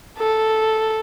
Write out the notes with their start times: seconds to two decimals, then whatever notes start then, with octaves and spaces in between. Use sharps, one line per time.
0.19 A4